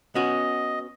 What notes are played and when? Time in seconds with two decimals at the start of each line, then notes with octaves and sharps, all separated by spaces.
0.15 B3 C#4 F#4 D#5